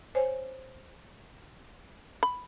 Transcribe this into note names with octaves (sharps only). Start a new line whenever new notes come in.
C5 C#5 G#5
B5